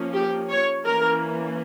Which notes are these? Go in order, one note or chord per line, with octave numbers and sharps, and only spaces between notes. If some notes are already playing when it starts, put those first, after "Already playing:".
Already playing: F3 A#3 C#4
G4
C#5
E3 A#3 C#4 A#4